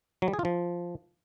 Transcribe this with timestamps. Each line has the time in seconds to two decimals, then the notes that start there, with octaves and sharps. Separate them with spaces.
0.22 F#3
0.28 G3
0.33 G#4
0.39 F4
0.45 F3